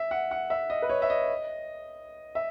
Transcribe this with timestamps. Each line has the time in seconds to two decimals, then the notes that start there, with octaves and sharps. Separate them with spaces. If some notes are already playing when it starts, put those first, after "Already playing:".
Already playing: E5
0.11 F#5
0.31 F#5
0.50 E5
0.70 D#5
0.82 B4
0.90 C#5
1.02 E5
1.10 D#5
2.35 E5